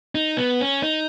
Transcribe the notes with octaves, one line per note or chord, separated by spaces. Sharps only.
D#4
B3
C#4
D#4